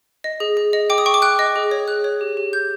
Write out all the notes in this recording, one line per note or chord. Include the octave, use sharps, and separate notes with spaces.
D#5
G#4
G#4
D#5
G5 D6
D#6
G5 C#6
D6
G5 F#6
D#5
G#4
C#5
G#4 F#6
C#5
G4
G4
G4 G6